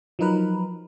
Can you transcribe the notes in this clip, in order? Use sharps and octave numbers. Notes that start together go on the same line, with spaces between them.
F3 F#3 D#4 A#4 B4